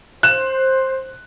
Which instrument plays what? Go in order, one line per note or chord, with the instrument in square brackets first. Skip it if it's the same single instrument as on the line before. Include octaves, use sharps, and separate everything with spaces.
[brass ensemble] C5 [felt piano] F#6 E7